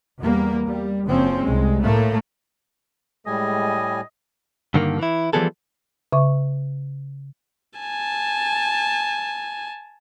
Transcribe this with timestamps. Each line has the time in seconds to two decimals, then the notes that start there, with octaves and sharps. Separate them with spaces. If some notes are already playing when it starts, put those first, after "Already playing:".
0.19 E2 G3 A#3
0.65 G3
1.06 F#1 F3 C4 C#4
1.42 C2 G#3
1.81 A2 A3 A#3
3.27 A2 G3 G#3 D#5 G#5
4.74 G2 D3 D#3 G#3 A#3
4.99 E3 E4
5.33 E3 F3 G3 B3 G#4 A4
6.13 C#3 E5 C#6
7.79 G#5 A5